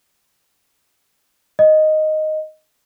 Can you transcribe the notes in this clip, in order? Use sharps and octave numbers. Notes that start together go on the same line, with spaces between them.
D#5